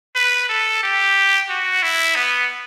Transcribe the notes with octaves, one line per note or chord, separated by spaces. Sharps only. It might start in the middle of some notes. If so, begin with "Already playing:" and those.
B4
A4
G4
F#4
E4
B3